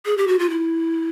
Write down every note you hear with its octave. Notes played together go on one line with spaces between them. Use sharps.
G#4
G4
F#4
F4
E4